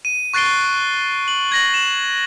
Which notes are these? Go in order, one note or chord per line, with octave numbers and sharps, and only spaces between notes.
D#7
C#6 F#6 A6 C7 D7 G7
F#7
G#6 A#6 F#7
E7 F#7